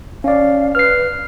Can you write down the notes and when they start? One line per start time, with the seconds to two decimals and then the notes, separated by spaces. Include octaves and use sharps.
0.24 C#4 D5 F5
0.75 B4 F6 C7